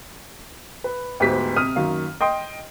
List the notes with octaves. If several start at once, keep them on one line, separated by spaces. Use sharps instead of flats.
B4
D2 G#2 B3 G4 C5 B6
C3 D#6 F6 D#7
F#2 D#3 A#3 F5
D#5 G5 C6 D#6